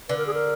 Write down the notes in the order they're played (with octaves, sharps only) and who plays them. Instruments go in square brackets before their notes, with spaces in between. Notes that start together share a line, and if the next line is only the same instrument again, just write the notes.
[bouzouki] D3 [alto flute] B4
[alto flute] A#4
G#4
A#4